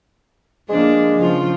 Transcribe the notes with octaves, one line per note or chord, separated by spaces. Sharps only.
F3 G#3 A#3 D4
C#3 F3 F4